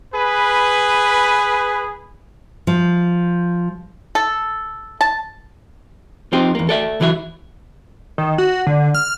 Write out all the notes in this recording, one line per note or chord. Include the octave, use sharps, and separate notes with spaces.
G#4 B4
F3
A4
A5
F3 C4 D#4 G4
E2 A#3
A4 D5 E5
C#2 E3 F#3 D5 E5
D#3
F#4
D3
F6